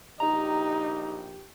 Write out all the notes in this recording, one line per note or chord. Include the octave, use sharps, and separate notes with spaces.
A#1 D#4 G4 A#5